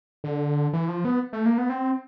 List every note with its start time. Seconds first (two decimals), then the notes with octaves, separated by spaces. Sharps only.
0.24 D3
0.73 E3
0.88 F3
1.05 B3
1.33 A3
1.46 A#3
1.58 B3
1.69 C4